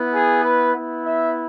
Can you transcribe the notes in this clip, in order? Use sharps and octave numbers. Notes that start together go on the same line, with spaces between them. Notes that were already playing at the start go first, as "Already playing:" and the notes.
Already playing: B3 E4
G#4
B4
B3 E4
E5